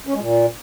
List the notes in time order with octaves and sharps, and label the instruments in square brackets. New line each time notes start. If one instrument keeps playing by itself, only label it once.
[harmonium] C#4
G#3
A#2